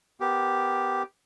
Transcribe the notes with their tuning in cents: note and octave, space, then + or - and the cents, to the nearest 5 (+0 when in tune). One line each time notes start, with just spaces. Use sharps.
B3 +15 G4 +0 A#4 +10